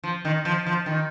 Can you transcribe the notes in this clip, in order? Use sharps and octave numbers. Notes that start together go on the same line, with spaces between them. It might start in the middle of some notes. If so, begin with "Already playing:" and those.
F3
D#3
F3
F3
D#3